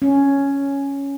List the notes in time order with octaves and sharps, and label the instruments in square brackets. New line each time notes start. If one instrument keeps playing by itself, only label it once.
[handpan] C#4